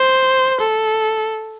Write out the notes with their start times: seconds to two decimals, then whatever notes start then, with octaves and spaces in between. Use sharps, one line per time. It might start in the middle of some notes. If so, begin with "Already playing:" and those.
Already playing: C5
0.60 A4